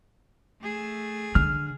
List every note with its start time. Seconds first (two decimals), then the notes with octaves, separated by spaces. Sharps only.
0.61 A3 G#4
1.35 D3 F6